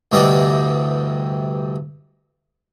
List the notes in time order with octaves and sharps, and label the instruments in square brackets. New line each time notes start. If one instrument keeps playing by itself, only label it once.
[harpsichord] D2 G2 C3 E3 G3 D#5